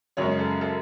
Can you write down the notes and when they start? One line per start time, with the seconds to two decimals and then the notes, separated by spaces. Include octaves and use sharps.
0.17 F#2 C#3 G#3 C#5
0.39 A4
0.61 A4